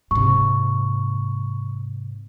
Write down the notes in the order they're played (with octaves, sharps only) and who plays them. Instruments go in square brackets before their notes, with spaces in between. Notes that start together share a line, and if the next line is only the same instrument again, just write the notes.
[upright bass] G#2 C3 [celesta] C#6